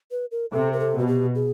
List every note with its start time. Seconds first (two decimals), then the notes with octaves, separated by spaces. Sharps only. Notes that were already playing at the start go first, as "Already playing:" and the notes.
0.11 B4
0.31 A#4
0.52 C3 A4
0.73 A#4
0.80 A4
0.94 B2 F#4
1.07 G4
1.35 G#4